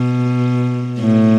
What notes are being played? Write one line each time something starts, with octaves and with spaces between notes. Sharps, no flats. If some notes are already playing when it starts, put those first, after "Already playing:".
Already playing: B2
A2